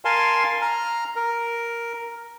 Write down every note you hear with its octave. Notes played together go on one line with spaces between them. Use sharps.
A#4 F5 G#5 A5 C6
A#5 F6
A#4